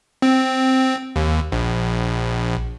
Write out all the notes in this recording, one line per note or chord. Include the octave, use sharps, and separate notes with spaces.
C4
D#2
A#1